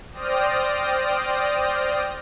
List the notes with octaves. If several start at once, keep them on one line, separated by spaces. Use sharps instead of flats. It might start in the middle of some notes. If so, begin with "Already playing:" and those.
C5 D5 G5 D#6 F6 A#6